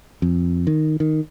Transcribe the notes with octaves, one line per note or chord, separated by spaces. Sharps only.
F2
D#3
D#3